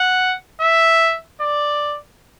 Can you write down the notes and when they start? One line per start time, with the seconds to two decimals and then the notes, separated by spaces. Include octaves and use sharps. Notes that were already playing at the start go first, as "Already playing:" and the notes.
Already playing: F#5
0.61 E5
1.41 D5